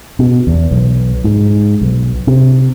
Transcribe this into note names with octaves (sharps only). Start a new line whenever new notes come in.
B2
E2
B1
G#2
B1
C3